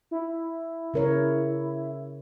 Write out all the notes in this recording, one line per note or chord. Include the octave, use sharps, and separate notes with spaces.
E4
C#3 A#4 C#5